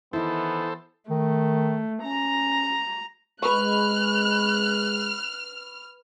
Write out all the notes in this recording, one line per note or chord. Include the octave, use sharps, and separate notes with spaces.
D#3 E3 B3 E4 A4 C5
D#3 A3
C#4 A#5
G#3 B4 C#6 F6 F#6